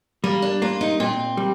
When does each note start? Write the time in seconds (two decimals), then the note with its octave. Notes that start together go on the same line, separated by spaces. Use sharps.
0.24 G3 A#3
0.42 D4
0.62 A#3 F4
0.81 D#4
1.00 A#2 C4
1.37 G3